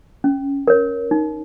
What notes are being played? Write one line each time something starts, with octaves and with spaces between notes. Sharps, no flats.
C#4
A#4 C#5
D#4